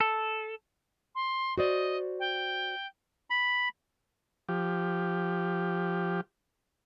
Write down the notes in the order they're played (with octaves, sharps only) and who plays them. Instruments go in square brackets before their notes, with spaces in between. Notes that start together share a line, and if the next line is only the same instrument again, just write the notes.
[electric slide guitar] A4
[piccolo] C6
[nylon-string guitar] F#4 C5 D5 [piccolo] D#5
[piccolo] G5
[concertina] B5
[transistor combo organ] F3 G4